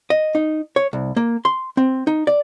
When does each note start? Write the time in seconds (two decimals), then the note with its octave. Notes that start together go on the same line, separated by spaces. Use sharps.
0.10 D#5
0.35 D#4
0.76 C#5
0.93 C2
1.16 A#3
1.45 C6
1.77 C4
2.07 D#4
2.27 D5